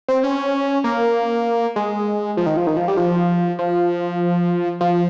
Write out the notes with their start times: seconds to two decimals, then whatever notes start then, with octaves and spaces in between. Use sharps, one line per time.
0.08 C4
0.23 C#4
0.84 A#3
1.76 G#3
2.37 F3
2.46 D#3
2.57 F3
2.67 D#3
2.77 F3
2.88 G3
2.97 F3
3.59 F3
4.81 F3